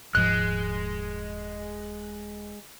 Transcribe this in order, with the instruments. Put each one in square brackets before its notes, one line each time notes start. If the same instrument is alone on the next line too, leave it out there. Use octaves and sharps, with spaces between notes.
[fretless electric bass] D#1 G#2 F3 [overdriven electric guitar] G#3 [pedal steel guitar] F#6